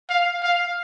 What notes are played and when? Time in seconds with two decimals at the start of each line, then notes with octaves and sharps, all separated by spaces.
0.10 F5
0.43 F5